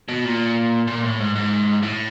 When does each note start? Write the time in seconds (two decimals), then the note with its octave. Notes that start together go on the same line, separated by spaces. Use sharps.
0.09 B2
0.25 A#2
0.87 A#2
1.04 A2
1.19 G#2
1.35 G#2
1.83 A2